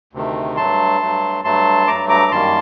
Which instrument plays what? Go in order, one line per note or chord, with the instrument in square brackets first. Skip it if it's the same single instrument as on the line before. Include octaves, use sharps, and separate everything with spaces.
[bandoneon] D2 C3 D#3 A3
G2 F#3 A3 A5 C6
G2 F#3 A3
G2 F#3 A3 A5 C6
G2 F#3 A3 A#5 D6
A#5 D6
F#2 D#3 G3 A#3 A5 C6